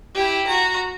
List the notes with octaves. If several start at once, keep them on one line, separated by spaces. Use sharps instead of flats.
E4 G4
F#4 A#5